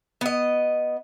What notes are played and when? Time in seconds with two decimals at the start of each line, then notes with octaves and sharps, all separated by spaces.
0.21 B3 D#5